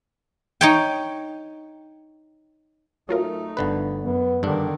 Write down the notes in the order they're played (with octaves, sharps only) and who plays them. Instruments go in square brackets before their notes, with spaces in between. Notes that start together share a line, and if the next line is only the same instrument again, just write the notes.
[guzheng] D#4 C#5 G5
[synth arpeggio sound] F#3 F4 A#4 [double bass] A3 D#4
[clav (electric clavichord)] G1 D3 B4
[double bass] F#2 [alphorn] B3
[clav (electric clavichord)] G2 D4 [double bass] D3 D#3